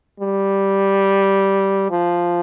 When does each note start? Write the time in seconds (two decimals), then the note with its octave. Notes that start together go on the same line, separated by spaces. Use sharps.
0.20 G3
1.91 F3